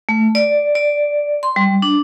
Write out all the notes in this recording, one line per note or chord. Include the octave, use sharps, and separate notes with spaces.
A3
D5
D5
C6
G3
D4